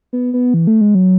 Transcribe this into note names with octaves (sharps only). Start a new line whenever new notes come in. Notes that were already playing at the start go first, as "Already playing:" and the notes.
B3
B3
E3
A3
G#3
F#3